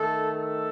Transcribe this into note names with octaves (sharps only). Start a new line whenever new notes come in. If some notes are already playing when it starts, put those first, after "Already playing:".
Already playing: D#3 A3 A4
A4